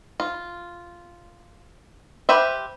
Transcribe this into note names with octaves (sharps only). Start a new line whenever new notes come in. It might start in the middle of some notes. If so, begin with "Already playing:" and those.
F4
G4 B4 C5 E5